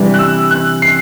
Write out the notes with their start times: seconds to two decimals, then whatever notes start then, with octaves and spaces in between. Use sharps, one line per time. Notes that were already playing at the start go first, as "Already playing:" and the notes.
Already playing: C3 E3 G3 D4
0.14 F#6
0.19 E6
0.51 F#6
0.82 C7